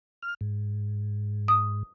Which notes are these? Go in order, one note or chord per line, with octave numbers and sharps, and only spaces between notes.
F6
G#2
D#6